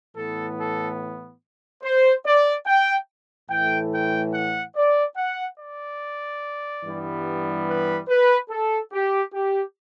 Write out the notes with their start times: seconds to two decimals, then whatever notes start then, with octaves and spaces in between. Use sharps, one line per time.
0.16 A2 E3 B3 A4
0.58 A4
1.83 C5
2.24 D5
2.66 G5
3.49 A2 E3 A3 G5
3.91 G5
4.32 F#5
4.75 D5
5.16 F#5
5.58 D5
6.84 G2 E3 G3 B3
7.67 B4
8.08 B4
8.49 A4
8.92 G4
9.33 G4